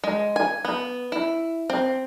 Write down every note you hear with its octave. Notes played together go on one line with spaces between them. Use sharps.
G#3
G#5
B3
E4
C4